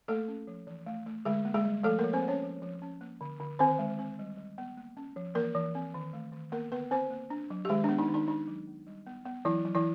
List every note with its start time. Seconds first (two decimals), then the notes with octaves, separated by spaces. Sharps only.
0.08 A3 A#3 A4
0.28 C#4
0.47 F3
0.67 E3
0.87 A3
1.06 A3
1.25 D3 G#3 G#4
1.45 A#3
1.54 G#3 G#4
1.65 G3
1.83 F3 A3 A4
1.99 F3 A#3 A#4
2.13 C4 C5
2.23 A#3
2.28 C#4 C#5
2.43 F3
2.62 F3
2.82 C#4
3.01 A#3
3.21 D3
3.40 D3
3.59 D#3 C4 C5
3.79 G#3
3.99 C4
4.19 G3
4.37 G3
4.58 B3
4.77 A#3
4.97 C#4
5.16 F3
5.35 E3 A#3 A#4
5.55 E3
5.75 C4
5.94 D#3
6.13 A3
6.32 D#3
6.52 A#3 B3 A#4
6.72 D3 B3 B4
6.91 B3 C4 C5
7.11 A#3
7.30 D4
7.50 F#3
7.65 G4
7.69 D#3 G#3 G#4
7.84 B3 D4
7.98 D#4
8.09 D#3
8.14 D#4
8.28 D4 D#4
8.48 F#3
8.67 B3
8.87 G3
9.06 B3
9.26 B3
9.45 E3 F#3 E4
9.65 F#3
9.75 E3 E4